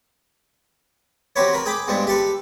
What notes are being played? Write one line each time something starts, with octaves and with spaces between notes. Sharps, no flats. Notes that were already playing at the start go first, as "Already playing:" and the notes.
C4 F#4 G4 B4 C#5
A#4 B4
G#4 G5 B5 D6
G2 B2 G#3 C4 D4
G4 A4 B4